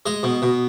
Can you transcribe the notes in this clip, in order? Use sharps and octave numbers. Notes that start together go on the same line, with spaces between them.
G#3 D#5
B2
B2